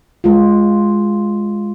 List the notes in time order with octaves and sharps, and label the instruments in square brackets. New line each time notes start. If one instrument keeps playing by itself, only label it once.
[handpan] G#3 F4